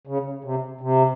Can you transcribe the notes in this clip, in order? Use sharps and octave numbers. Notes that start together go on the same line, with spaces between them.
C#3
C3
C3